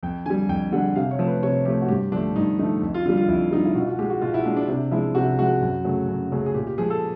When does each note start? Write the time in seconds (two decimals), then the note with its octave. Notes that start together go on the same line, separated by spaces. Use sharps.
0.03 F2 G5
0.26 D3 G3 G#5
0.49 F2 G5
0.72 D3 G3 F#5
0.96 C3 F5
1.11 C#5
1.19 F3 A3
1.28 B4
1.43 C3 C#5
1.65 F3 A3 G4
1.82 F#4
1.89 G2 G4
2.12 D3 F3 A3 D4
2.36 G2 D#4
2.59 D3 F3 A3 D#4
2.82 F2
2.94 F4
3.06 D3 F4
3.09 G3
3.17 F4
3.28 F2 E4
3.51 D3 G3 D#4
3.65 E4
3.75 B2 F4
3.87 F#4
3.99 G#3 G4
4.10 F#4
4.21 B2 F4
4.34 E4
4.45 G#3 D4
4.57 D4
4.68 C3 D4
4.91 F3 G#3 E4
5.15 C3 F#4
5.38 F3 G#3 F#4
5.61 F#2
5.84 C#3 F#3 A3
6.08 F#2
6.32 C#3 F#3 A3
6.46 G#4
6.54 A#2 G4
6.67 G4
6.78 F3 G#3 G#4
6.90 A4